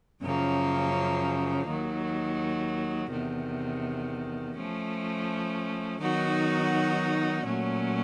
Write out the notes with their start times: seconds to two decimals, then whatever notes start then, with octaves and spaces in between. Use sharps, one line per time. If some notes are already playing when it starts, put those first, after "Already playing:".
0.22 F#2 C#3 F3 A#3
1.66 D#2 D#3 F#3
3.10 E2 C3 D#3
4.55 F3 A3 C#4
5.99 D#3 F#3 B3 D#4 F#4
7.44 A#2 F#3 A3 C#4